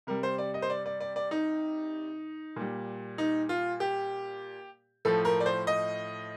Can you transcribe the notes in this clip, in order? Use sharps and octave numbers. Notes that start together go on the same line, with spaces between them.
C3 G3 A#4
C5
D5
D#5
C5
D5
D5
D5
D5
D#4
A#2 G3
D#4
F4
G4
A2 F3 A4
A#4
D5
C5
D#5